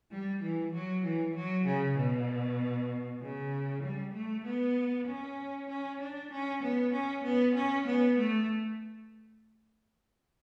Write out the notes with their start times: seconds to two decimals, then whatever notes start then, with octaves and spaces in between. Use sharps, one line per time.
0.11 G3
0.42 E3
0.72 F#3
1.04 E3
1.35 F#3
1.65 C#3
1.97 B2
3.21 C#3
3.83 G3
4.13 A3
4.45 B3
5.07 C#4
5.68 C#4
6.00 D4
6.31 C#4
6.62 B3
6.92 C#4
7.23 B3
7.55 C#4
7.86 B3
8.17 A3